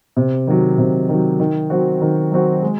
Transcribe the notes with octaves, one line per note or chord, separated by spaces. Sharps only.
C3
D#3 F#3
C3
D#3 F#3
D#3
F#3 C4 F#4
D#3
F#3 C4 F#4
G#3